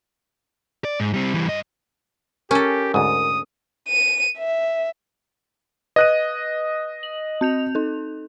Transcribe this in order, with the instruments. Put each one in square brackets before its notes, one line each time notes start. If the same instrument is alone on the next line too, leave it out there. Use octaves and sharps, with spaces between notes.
[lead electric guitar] D5
G#2
G3 C4
E3 G3
G2 D#5
[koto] C#4 A4 [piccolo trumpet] G4 [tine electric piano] A#4
[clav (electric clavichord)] D2 G#2 [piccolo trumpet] D#6
[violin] D#7
E5
[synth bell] B4 [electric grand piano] D#5 F#6 D#7
[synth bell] F#7
C4 G6 F7
D#4 A4